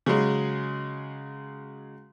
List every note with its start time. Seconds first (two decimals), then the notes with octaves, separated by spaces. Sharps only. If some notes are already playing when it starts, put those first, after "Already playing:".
0.06 C#3 F#3 G#3